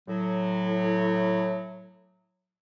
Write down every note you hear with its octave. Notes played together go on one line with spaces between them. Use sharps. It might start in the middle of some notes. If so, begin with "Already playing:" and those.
A2 F#3